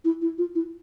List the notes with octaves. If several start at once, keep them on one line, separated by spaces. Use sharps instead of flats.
E4
E4
F4
E4